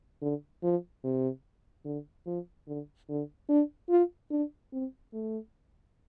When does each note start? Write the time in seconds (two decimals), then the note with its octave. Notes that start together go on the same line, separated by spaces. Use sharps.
0.22 D3
0.63 F3
1.04 C3
1.85 D3
2.26 F3
2.67 D3
3.09 D3
3.49 D4
3.90 F4
4.31 D4
4.73 C4
5.13 A3